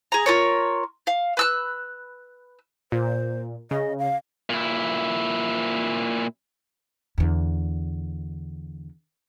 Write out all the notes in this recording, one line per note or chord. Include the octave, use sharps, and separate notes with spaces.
G#4 A#5
F4 A#4 C#5
F5
B4 E6 F#6
A#2 C5
C#3 D#5
F5
A#2 E4
E2 D3